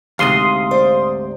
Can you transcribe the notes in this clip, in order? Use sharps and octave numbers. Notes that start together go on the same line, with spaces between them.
D2 G#2 C3 F5 C6 D#6
C5 D5